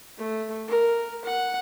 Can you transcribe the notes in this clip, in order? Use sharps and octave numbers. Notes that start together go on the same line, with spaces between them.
A3
A#4
F#5